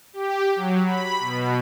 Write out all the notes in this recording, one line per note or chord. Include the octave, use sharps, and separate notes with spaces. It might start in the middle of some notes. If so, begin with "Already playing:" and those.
G4
F#3
B5
B2